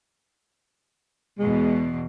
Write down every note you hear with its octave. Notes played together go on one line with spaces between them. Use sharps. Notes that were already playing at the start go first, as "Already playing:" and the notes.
E2 B2 G#3